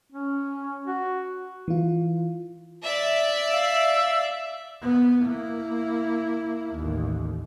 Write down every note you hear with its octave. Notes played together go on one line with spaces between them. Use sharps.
C#4
F#4
E3 F4
D5 E5
F5 E6
B3
A#3 E4
A1 D#2